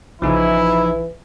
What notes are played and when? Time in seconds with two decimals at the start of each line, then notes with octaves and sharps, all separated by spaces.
0.22 A#1 C#3 E3 F3 D#4 E4 G#5